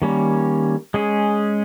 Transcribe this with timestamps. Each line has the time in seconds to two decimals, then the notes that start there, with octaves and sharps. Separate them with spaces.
0.02 D#3 G3 A#3 C#4
0.94 G#3 C#4 G#4